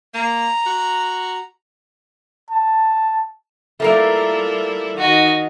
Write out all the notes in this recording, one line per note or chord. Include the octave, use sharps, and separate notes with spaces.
A#3 A#5
F#4
A5
G3 A3 A#3 E4 F4 A#4
D#3 D#4 F#4 D#5